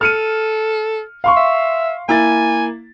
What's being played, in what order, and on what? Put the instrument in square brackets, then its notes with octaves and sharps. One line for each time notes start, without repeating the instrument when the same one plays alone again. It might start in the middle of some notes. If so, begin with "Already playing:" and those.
[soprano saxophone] A4 [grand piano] F6 C#7 D#7
[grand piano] F5 C6 C#6
[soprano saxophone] E5
[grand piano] A#3 E4 A6 [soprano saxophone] G#5